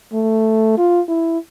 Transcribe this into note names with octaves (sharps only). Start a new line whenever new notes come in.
A3
F4
E4